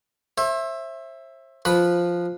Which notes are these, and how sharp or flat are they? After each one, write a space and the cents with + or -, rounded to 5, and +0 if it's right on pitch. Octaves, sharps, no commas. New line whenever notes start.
C5 +40 E5 +5
F3 +0 B4 -5 B5 +0